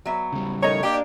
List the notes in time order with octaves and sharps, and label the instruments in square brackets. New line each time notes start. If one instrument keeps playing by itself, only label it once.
[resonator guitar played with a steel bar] F#3 B3 E5
[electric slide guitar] C#3 G3
[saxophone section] D#3 A3 C#5 [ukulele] D#5 A#5
[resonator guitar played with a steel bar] A#3 D4 [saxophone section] G4